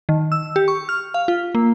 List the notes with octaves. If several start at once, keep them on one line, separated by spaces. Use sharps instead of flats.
D#3
E6
G4
C#6
F6
F5
F4
A#3